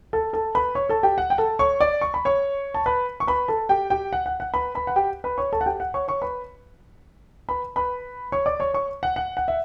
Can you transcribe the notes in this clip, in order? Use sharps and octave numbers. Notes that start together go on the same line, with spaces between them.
A4 A5
A4 A5
B4 B5
C#5 C#6
A4 A5
G4 G5
F#5
G5
A4 A5
C#5 C#6
D5 D6
C#6
B5
C#5 C#6
A5
B4 B5
C#6
B4 B5
A4 A5
G4 G5
G4 G5
F#5
F#5
F#5
B4 B5
B4 B5
F#5
G4 G5
B4 B5
C#5 C#6
A4 A5
F#5
G4 G5
F#5
C#5 C#6
C#5 C#6
B4 B5
B4 B5
B4 B5
C#5 C#6
D5 D6
C#5 C#6
C#5 C#6
F#5
F#5
F#5
E5